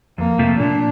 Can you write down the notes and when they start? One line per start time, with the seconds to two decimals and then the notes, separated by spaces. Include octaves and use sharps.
0.18 F2 A#3
0.39 C3 F3 A3
0.59 A#2 D4